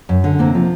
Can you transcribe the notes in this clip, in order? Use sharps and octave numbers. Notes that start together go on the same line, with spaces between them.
F#2
D3
C3 A#3 C4
F3